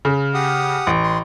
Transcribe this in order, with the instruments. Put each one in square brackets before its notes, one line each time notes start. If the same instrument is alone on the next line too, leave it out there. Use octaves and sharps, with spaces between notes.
[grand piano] C#3
[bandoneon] G4 F#5 D#6
[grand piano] A1
[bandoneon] C6